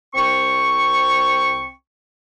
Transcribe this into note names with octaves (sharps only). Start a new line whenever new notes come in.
C2 C4 G5 C#6